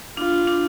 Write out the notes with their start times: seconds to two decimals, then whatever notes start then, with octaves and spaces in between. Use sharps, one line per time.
0.17 D4 F4
0.47 D4